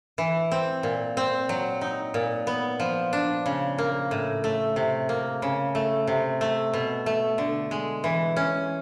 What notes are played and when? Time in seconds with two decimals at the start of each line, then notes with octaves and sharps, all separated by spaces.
0.18 E3
0.51 C4
0.83 A#2
1.17 C4
1.49 F#3
1.81 D#4
2.14 A#2
2.47 B3
2.80 F3
3.13 D4
3.46 C#3
3.78 A#3
4.11 A2
4.44 A3
4.76 C3
5.09 A#3
5.42 C#3
5.75 A3
6.07 C3
6.41 A3
6.74 B2
7.06 A3
7.38 D3
7.71 G#3
8.04 E3
8.36 C#4